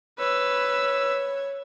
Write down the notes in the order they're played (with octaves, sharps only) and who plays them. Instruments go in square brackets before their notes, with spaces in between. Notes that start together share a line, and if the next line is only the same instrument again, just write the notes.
[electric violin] B4 E6 [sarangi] C#5